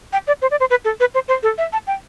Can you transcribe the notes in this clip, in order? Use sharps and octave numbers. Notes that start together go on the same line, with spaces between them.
G5
D5
C5
D5
C5
B4
A4
B4
C5
C5
A4
E5
A5
G5